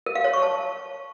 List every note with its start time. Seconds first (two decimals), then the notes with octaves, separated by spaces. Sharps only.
0.06 A#4
0.15 F5
0.24 C#5
0.34 C#6
0.43 A5